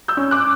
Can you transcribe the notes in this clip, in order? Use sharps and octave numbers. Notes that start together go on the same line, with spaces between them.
E6 G6
C#4
D6 F#6